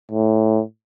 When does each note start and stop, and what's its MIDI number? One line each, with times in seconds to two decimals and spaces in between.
0.11 0.62 45